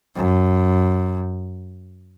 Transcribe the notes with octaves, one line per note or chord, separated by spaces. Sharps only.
F#2